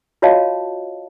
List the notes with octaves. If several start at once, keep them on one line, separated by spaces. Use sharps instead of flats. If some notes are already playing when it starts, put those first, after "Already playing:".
F4 F#4 C#5 D#5 F5 A5